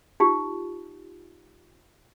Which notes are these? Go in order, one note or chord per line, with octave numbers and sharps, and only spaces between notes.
D#4 F4 G4